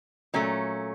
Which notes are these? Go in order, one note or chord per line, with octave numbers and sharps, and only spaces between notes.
A#2 F#3 A3 C#4